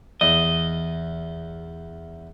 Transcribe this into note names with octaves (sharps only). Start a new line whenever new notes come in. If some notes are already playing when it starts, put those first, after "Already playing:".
E2 D#5